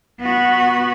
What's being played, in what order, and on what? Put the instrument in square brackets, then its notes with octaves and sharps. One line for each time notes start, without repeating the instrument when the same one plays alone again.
[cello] B3 F#4